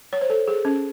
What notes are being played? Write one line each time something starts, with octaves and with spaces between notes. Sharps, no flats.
C#5
C5
A4
G#4
C#4